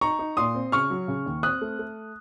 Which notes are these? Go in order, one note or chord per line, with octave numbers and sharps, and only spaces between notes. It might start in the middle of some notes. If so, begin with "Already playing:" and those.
D#4 A#5 C#6
D#4
A#2 C6 D#6
C4
C#3 C#6 F6
F#3
C#3
D#2
C4 D#6 F#6
A3
A3